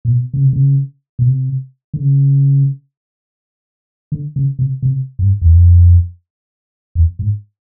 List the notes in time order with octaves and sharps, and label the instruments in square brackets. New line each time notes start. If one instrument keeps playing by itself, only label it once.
[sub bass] A#2
B2
C#3
C3
C#3
B2
C3
D3
C#3
D3
C#3
C3
C3
G2
E2
F2
E2
G#2